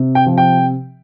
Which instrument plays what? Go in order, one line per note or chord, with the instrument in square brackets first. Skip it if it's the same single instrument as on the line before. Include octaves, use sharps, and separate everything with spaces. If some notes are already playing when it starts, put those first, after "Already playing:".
Already playing: [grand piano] C3
G5
F3
G5